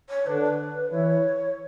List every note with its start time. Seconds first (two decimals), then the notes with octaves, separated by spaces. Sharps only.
0.09 C#5
0.26 D3 D4 B4
0.43 B4
0.91 E3 E4 C#5